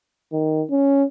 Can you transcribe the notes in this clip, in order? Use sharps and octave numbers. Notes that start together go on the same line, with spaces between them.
D#3
C#4